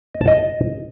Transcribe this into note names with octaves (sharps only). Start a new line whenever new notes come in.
D#5
A5
D#5